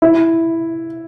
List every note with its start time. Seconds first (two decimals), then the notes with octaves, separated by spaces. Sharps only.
0.02 E4